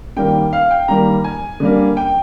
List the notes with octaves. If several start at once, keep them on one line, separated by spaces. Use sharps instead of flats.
D#3 G3 A#3 G5
F5
G5
D#3 G3 A#3 A#5
G#5
D3 G3 A#3
G5